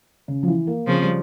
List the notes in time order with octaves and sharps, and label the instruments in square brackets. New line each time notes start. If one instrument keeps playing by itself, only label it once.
[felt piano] C#3
F3
E3
A#3
[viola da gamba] C#3 F3 [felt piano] C4
[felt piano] G3